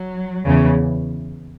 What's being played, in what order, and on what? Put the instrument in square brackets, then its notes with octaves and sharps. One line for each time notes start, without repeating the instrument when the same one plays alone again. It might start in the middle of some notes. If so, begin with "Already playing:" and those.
Already playing: [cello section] F#3
E2 C#3 E3